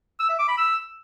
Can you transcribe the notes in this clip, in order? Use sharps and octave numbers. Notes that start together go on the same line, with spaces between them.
E6
E5
D6
B5
E6